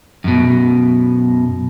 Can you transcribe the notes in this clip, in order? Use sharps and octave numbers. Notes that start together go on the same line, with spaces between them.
F#2 B2